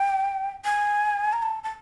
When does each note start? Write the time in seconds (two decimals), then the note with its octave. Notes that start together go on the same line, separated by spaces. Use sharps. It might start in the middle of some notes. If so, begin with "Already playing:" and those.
Already playing: G5
0.65 G#5
1.33 A#5
1.42 A5
1.63 A5